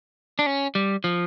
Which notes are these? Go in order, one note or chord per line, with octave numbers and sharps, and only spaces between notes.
D4
C#4
G3
F3